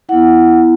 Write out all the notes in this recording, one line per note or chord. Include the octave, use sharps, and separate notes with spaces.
B3 E4 F#5